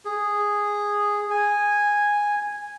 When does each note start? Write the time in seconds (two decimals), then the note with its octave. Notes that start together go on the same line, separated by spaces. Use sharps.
0.05 G#4
1.30 G#5